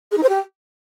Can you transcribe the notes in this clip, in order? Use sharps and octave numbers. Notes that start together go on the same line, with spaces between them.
G#4
D#4
C5
G4